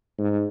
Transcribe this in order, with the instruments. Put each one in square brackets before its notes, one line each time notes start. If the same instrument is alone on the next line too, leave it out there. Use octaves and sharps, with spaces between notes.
[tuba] G#2